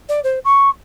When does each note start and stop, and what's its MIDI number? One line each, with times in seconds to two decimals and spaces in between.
0.09 0.20 74
0.24 0.39 72
0.45 0.69 85